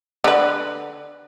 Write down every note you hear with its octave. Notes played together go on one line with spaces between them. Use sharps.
D3 B4